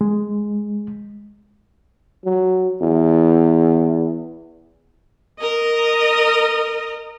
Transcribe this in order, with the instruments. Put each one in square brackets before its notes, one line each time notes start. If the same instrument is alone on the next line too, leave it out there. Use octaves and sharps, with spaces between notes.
[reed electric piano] G#3
[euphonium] F#3
E2
[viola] A#4 D#5